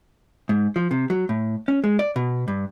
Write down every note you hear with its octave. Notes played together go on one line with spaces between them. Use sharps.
G#2
F3
C3
F#3
A2
C#4
G#3
D5
B2
G2